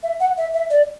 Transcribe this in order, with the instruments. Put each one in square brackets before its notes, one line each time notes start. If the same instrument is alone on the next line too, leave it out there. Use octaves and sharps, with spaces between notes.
[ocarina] E5
F#5
E5
E5
D5